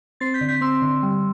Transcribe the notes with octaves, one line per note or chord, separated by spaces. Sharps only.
C4 A6 C7
G6 B6
D3
G6 B6
C4 C6 E6
D3
G3